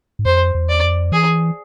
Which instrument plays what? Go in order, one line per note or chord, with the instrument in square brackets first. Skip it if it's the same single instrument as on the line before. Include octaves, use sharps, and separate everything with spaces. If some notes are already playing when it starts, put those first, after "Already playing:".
[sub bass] G#2
[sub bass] F2 [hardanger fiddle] C5
[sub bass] E2
[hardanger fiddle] D5
[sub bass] F2
[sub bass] E3 [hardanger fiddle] G#4